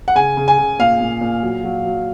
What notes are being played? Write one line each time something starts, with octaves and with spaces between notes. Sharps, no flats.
F#5
C#3 G#5
C#3
G#5
C#3
A#2 F5
A#2
A#2
F#3
F#3
F#3